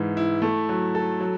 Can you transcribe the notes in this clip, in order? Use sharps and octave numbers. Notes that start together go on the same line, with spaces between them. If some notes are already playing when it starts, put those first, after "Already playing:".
Already playing: G#2 E3
E4
A3
F#3
A4
F#3